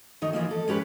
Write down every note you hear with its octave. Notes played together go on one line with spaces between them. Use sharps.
D2 D#3 D#4
E3 F3 A#3
A4
G#3 C#4 G4 B4